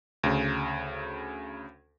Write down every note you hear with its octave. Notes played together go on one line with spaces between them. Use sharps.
D2 C#3